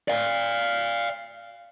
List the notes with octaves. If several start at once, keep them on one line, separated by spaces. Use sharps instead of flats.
D5 F5